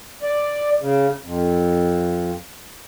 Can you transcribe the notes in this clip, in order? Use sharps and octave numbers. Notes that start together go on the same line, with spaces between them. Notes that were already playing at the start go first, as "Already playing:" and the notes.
D5
C#3
F2